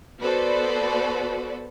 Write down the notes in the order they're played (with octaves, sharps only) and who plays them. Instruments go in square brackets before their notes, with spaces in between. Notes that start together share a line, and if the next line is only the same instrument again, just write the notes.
[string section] B3 F#4 A4 B4 C5 D5